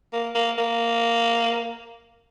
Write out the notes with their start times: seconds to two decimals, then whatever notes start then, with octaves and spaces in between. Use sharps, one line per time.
0.13 A#3
0.35 A#3
0.58 A#3